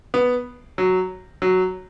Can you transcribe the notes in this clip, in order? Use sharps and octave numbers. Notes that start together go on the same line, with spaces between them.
B3
F#3
F#3